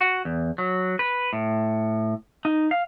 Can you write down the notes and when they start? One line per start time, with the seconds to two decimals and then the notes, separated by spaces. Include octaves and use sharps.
0.01 F#4
0.25 E2
0.58 F#3
0.99 B4
1.33 A2
2.45 D#4
2.71 F5